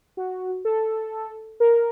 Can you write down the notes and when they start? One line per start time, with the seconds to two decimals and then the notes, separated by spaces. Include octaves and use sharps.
0.17 F#4
0.65 A4
1.60 A#4